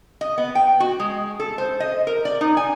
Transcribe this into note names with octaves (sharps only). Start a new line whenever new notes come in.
D#5
B3
G5
F#4
G#3
A4
C5
D#5
A#4
D5
D#4
G#5